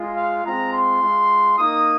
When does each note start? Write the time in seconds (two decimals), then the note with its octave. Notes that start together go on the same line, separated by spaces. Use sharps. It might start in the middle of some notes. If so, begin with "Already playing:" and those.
Already playing: G#3 F4
0.17 F5
0.45 G#3 C4 F4 A#5
0.74 C6
1.02 G#3 F4
1.58 A#3 D#4 D#6